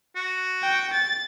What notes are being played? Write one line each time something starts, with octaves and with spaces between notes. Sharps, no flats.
F#4
G5
A6